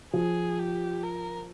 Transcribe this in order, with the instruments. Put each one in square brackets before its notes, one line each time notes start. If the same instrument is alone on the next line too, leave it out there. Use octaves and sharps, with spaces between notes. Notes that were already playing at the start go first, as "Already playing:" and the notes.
[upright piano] F3 [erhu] G#4
[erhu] G4
A#4